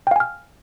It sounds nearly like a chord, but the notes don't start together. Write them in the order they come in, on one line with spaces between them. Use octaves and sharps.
G5 F5 G#5 F6